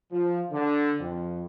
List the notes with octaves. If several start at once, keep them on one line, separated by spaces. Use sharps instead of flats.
F3
D3
F2